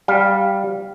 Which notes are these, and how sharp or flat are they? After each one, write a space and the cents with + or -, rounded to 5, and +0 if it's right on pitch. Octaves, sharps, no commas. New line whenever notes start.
G3 +0 F5 -5